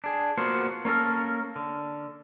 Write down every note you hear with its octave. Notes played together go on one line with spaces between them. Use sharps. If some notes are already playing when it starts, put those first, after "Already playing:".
D4 G#4
A#3 B3 F4 F#4 C5
A#3 C#4 A4 A#4
D3